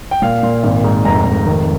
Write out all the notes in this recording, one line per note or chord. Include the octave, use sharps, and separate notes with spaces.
G5
A#2 F5
A#2
G#1
G#2
F1 A#5
F1
D#3